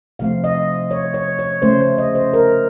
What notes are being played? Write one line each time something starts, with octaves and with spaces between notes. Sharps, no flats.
C3 F3 A3 C4 F5
D#5
C#5
C#5
C#5
C#3 A3 C#4 C5
C5
D#5
C5
A#4